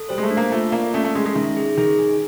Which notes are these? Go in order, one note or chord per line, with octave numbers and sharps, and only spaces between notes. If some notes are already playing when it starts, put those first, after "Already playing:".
Already playing: A4
G3 C5
G#3
A3
D4
A#3
A3 F4
A#3 D5
A3 C#4
A3
G#3 C#4
G#3
D#3 E5
G#4
D#3 G#4
G#5